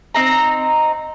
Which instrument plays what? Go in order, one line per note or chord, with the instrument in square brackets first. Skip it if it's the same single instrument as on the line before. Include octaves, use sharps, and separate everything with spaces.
[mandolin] C4 D#4 A#5